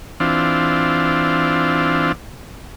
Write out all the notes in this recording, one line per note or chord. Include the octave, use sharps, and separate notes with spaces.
E3 C4 D4 F4